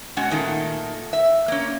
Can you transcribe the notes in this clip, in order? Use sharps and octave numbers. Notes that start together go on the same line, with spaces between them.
B2 G#3 C#4 F#4 F#5
A#2 D#3 A3
E5
A#3 C#4